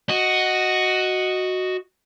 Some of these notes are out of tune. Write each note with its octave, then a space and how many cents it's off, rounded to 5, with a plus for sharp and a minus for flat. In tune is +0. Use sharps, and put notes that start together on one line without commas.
F#4 +0 D#5 +0